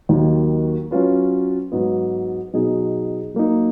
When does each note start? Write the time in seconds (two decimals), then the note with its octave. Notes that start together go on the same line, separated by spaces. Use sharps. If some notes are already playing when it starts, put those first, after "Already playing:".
0.09 D#2 D#3 F#3
0.91 F#3 C#4 F4 B4
1.72 G#2 F#3 B3
2.53 B2 F#3 B3 D#4 G#4
3.34 F#3 A#3 D#4